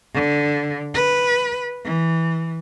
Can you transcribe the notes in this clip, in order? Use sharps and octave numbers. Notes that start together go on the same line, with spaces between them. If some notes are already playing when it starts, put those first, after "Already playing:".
D3
B4
E3